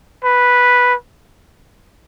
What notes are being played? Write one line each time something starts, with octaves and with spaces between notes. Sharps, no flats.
B4